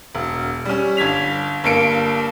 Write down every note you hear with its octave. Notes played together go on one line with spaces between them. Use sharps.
E1
G3 C#4
G1 G#6 B6 F7
G1 G2 A#3 C#7 D7